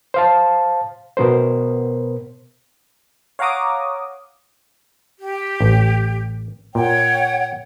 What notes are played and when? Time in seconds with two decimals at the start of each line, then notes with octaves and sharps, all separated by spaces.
0.14 C5 F5 A5
1.17 B2 B3 A#4 C5
3.39 C#5 F5 F#5 A#5 D6 D#6
5.19 G4
5.60 A1
6.75 A#2 C#5 F#5 G5